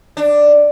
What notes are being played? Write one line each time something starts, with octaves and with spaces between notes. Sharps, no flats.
D4